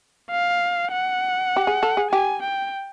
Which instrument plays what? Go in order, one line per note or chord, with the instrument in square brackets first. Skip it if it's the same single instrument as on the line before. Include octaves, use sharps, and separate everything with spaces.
[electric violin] F5
F#5
[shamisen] G4
G#4
A4
G#4
[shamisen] G4 [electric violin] G#5
[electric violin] G5